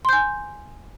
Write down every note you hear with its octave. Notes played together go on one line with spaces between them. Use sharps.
G#5 C6 G6